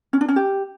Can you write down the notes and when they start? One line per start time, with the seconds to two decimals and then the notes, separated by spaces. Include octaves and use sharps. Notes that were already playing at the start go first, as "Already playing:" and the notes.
0.13 C#4
0.21 D4
0.28 C#4
0.36 G4